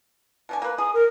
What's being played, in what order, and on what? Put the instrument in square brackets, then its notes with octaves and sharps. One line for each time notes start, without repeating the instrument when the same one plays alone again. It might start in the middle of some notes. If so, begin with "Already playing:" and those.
[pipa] B2 D3 G#5
A#3 B4
[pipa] G#4 [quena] D#6
[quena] A#4